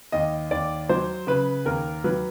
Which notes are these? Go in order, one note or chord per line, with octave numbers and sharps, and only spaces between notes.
D#2 D#5
D#2 D5
F#3 C5
C#3 B4
D#2 A#4
F#3 B4